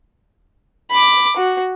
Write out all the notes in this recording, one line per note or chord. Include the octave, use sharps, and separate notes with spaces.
B5 D6
F#4